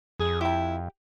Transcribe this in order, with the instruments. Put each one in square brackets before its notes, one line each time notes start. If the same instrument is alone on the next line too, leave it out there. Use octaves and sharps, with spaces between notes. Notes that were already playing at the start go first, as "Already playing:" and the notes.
[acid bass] F2 [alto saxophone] G#4
[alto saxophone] E4 [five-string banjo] G4 G5